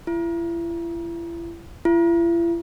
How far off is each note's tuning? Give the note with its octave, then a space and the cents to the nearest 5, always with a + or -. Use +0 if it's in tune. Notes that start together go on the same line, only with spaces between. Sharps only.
E4 +40
E4 +45